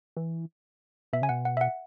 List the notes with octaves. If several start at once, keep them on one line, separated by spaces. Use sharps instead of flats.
E3
B2 E5
C#3 G#5
B2 F#5
F#5
E5
F#5